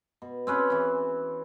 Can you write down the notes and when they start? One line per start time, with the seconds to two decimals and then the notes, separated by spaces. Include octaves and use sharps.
0.22 B2
0.47 C4 C#4 B4
0.70 E3 C4